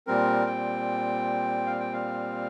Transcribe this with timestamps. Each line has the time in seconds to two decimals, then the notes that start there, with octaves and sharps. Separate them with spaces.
0.07 A#2 G3 C4 A#4
0.46 G5
1.66 F5
1.80 G5
1.93 F5